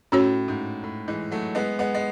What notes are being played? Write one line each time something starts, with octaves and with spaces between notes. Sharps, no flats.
A2 C#4 F#4 C#5
G#2
A2
E3 G#3
F#3 A3
G#3 B3
G#3 B3
G#3